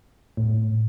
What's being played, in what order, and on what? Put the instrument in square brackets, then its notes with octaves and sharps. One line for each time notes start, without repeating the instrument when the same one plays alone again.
[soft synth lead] A2